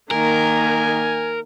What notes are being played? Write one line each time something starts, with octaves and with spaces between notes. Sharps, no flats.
D#3 A#3 A#4 G#5